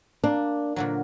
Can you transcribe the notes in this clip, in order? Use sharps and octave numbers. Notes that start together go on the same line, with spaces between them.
A#3 D4
A#2 D3 F#3